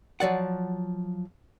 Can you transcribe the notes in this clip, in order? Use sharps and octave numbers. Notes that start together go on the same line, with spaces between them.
F3 F#3 D5 F#5